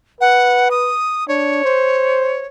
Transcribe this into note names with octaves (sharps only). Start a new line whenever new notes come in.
B4 F#5
D#6
D4 C#5
C5